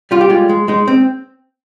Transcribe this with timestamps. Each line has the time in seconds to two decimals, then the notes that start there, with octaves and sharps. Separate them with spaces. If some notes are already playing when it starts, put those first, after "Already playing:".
0.11 G3 F4
0.21 G4
0.30 G#3 F4
0.49 G#3
0.68 G#3 D#4
0.88 C4